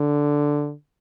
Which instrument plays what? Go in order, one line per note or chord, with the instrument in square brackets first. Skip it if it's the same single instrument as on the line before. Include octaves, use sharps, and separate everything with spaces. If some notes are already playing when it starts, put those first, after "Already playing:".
Already playing: [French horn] D3